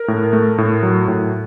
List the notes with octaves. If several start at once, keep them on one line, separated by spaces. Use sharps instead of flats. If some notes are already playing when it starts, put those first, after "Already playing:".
Already playing: A#4
A2
A3
A2
F#3
A2